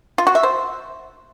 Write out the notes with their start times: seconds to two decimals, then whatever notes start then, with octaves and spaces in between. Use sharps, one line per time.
0.18 F4
0.27 F#4
0.35 E5
0.43 C5